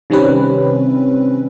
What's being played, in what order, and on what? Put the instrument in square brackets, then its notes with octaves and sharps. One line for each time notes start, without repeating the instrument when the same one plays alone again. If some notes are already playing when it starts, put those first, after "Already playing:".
[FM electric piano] C3 D#3 G3 C4 C#4 B4